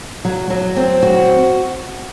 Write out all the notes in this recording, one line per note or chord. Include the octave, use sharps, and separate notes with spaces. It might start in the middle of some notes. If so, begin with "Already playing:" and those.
F#3
F#3
C4
F#4